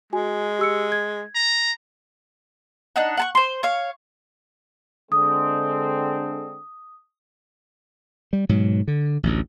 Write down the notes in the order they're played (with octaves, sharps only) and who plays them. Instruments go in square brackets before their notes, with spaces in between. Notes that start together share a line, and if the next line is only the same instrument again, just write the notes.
[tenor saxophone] G#3 [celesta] F#4 G#5
[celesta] G4 E6 C#7
G#6
[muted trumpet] A#5
[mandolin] D4 D#4 F#5
F#5 A5 C#6
C5 C6
C#5 F5
[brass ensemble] D3 G#3 C4 [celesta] D#6
[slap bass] G3
G#2 B2 F#3
D3
A1 D2